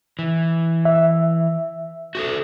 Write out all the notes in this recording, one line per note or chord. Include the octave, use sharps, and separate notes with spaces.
E3
E5
F#4 G4 A4